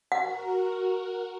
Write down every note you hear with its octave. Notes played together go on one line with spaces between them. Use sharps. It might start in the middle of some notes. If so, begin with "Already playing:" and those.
F#4 A#4 F#5